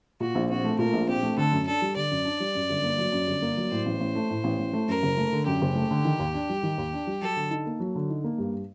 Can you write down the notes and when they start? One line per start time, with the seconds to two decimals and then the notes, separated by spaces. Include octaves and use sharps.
0.20 A#2 F#4
0.35 A#1
0.50 C4 F#4
0.64 A3
0.79 A#2 A#4
0.93 A#1
1.08 C4 G4
1.23 A3
1.38 D3 A4
1.52 F#2
1.67 D4 A4
1.82 G3
1.96 D3 D5
2.11 F#2
2.25 D4
2.40 G3
2.55 F#2
2.70 G1
2.84 A#3
2.98 F#3
3.12 F#2
3.27 G1
3.42 A#3
3.57 F#3
3.71 A2 C5
3.86 A1
4.00 A1
4.15 A3
4.30 A2
4.44 A1
4.59 A1
4.73 A3
4.88 F#2 A#4
5.03 F#1
5.17 A3
5.33 D3
5.46 F#2 G4
5.62 F#1
5.75 A3
5.91 D3
6.05 D#3
6.19 D#2
6.34 D4
6.50 G3
6.63 D#3
6.78 D#2
6.93 D4
7.07 G3
7.21 F#3 A4
7.37 D3
7.51 D#4
7.66 A#3
7.80 F#3
7.96 D3
8.10 D#4
8.24 A#3
8.38 G2